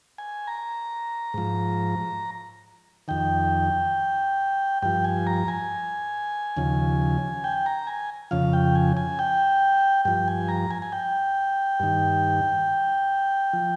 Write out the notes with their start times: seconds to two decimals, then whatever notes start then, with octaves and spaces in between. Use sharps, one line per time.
0.18 G#5
0.47 A#5
1.34 G#2 F3
3.08 F2 D#3 G5
4.82 G2 F3 G5
5.04 G#5
5.27 A#5
5.48 G#5
6.57 D#2 C#3 F3
7.44 G5
7.66 A#5
7.87 G#5
8.31 F2 C#3 F3 F5
8.53 G5
8.75 G#5
8.97 G#5
9.19 G5
10.05 G2 F3 G5
10.28 G#5
10.48 A#5
10.71 G#5
10.82 G#5
10.92 G5
11.80 G2 D#3
13.53 F3